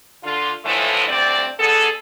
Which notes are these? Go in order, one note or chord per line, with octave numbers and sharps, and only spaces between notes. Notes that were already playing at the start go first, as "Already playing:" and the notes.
D3 F4
A2 D3 E3 F3 G#3 A3
D2 G2 C4 D5
D3 B3 G#4 A4